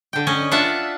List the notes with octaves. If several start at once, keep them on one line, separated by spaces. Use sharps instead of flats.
D3 G5
C#4 C#5 D#5
D4 F4 E5 F#5